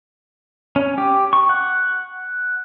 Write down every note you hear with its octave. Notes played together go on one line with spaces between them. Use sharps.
C#4
G4
C#6
F#5